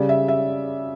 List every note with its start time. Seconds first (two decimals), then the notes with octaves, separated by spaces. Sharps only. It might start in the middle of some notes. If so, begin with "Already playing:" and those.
Already playing: C#3 G3 D5
0.09 E5
0.28 E5